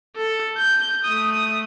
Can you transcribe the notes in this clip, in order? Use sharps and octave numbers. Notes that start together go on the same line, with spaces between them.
A4
G6
A3 D#6